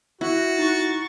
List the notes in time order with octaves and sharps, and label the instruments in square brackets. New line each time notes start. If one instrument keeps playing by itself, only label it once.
[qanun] E4 [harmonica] F#4
[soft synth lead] D#4 [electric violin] C#6 A6